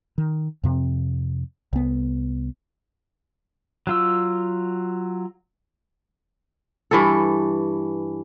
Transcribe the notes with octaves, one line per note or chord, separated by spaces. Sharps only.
D#3
F2 C3 C4
C2 B3
F#3 F4 E6
G2 E3 A4